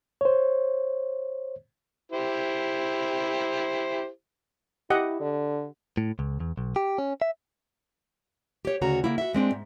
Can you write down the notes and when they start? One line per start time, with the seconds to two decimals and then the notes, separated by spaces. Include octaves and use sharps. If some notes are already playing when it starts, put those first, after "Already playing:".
0.21 C5 C#5
2.12 E4 G4 C5
4.90 E4 G4 D#5 F#5
5.20 D3
5.97 A2
6.19 C#2
6.40 E2
6.58 B1
6.76 G4
6.98 C#4
7.22 E5
8.65 G4 C#5
8.81 D2 C#3 F#4 C#5 A#5
9.04 C#3 A#3 E4
9.18 F#4 E5
9.33 A#2 G#3 C4 D4
9.51 G#2